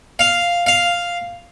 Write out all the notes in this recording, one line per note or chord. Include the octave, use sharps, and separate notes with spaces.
F5
F5